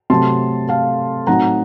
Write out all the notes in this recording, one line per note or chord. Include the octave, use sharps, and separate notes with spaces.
C3 F#3 A3 C4 A5 C6
F5 A5
A2 F#3 C4 D#4 F#5 A#5